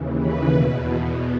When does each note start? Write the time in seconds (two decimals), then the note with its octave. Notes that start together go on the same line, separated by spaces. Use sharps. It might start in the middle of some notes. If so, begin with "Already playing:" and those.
Already playing: D#2 C#3 E3
0.18 B4
0.51 E2 B2